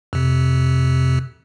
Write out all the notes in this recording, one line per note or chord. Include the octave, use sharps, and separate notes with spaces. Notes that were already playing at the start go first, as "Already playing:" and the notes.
F2 C3